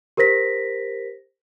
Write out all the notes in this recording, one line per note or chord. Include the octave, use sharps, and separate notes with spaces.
G4 A#4 C5 A#6 B6